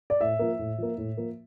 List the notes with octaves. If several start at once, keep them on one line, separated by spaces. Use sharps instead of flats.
D5
A2 E5
F3 A#3
A2
F3 A#3
A2
F3 A#3